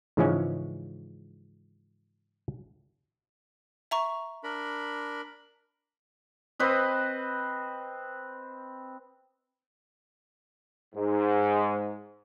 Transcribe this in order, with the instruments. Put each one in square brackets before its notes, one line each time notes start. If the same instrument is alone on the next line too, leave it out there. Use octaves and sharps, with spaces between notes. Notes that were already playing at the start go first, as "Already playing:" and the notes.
[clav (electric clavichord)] G#2 C#3 E3 F3 G#3 C#4
[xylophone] E5 A#5 C#6
[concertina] D4 A#4 B5
[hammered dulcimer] C4 B4 D#5
[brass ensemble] G#2